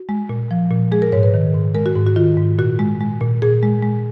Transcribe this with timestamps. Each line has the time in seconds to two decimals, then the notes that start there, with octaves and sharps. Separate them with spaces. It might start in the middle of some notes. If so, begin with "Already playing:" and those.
Already playing: F#4
0.09 G#3
0.29 A#2
0.51 F3
0.71 A#2
0.92 G#3 G#4
1.02 A#4
1.12 G#2 C#5
1.23 B4
1.34 D#3
1.54 G#2
1.75 G#3 A#4
1.86 F#4
1.95 G#2
2.07 F#4
2.16 D#3 F4
2.37 G#2
2.58 A#2 F#4
2.79 G#3
3.00 G#3
3.21 A#2
3.42 A#2 G#4
3.63 G#3
3.83 G#3